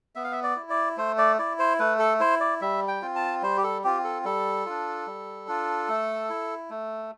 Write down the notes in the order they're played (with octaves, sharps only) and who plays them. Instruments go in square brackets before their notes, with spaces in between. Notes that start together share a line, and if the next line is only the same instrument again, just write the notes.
[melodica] B3 E5
F5
E5
D5
E4
D5
A3 C5
D5
E4 D5
C5
A3 B4
A4
E4 C5
D5
G3 E5
G5
C4 F4
A5
G3 C5
G4
A4
C4 F4 G4
A4
G3 A4
D4 F4
G3
D4 F4
A3
E4
A3